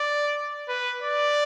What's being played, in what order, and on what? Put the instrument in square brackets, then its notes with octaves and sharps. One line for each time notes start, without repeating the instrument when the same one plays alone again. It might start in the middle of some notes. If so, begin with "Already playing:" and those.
Already playing: [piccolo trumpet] D5
B4
D5